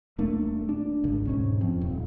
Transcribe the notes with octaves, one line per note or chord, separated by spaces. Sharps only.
D#1 A3 A#3 D4
D4
G#1 C#2
E1 G#2 C#4
F2
D#1